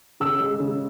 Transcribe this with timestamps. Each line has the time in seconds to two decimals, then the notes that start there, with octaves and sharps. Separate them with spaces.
0.20 C#3 E6
0.40 G#3
0.60 C#3